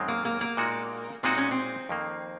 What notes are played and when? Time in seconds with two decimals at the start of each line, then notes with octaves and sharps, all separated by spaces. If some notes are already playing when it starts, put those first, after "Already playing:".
Already playing: F#2 D#3 G#3 C4
0.08 A#3
0.25 A#3
0.41 A#3
0.57 A#2 G#3 D#4 F#4
1.23 A#2 G#3 C4 D#4 F#4
1.37 C#4
1.51 C4
1.89 F2 D#3 A#3